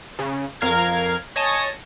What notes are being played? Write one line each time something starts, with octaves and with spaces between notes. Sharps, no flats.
C#3
F2 A#4 F5 F6 G#6
C#5 D#5 G#5 A5 A#6 C#7